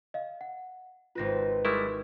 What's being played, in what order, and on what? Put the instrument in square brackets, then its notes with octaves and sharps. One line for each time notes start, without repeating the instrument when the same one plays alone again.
[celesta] D#5 F5
F#5
[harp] G#1 C4 B4 [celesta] F4 A#6
[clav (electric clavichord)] G3 G#3 E4 [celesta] A#4 C#6